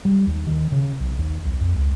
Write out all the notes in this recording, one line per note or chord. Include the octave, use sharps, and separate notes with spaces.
G3
D#2
D#3
C#3
B1
D#2
B1
F2
C#2